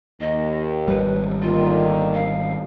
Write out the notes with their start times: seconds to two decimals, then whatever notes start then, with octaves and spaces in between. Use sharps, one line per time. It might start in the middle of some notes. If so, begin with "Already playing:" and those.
0.20 D#2 D#5
0.88 G#1 G3 B4
1.42 D3 D#3 A#3 F4
2.14 F5